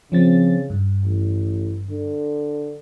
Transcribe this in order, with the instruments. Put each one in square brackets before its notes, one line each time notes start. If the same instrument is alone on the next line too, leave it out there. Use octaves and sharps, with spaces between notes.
[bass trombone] C#3 [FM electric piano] F3 C4 A6
[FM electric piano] G2
[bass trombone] A1
D3